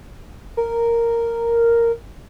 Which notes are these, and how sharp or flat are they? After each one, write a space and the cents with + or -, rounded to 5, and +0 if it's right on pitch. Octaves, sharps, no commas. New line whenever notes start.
A#4 -5